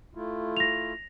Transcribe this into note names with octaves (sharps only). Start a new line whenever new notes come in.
A3 E4 F4
A#6 F7